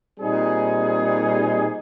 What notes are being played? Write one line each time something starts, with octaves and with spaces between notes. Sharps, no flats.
A#2 G3 C4 D#4 G#4